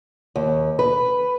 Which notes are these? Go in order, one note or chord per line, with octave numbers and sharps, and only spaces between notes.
D#2
B4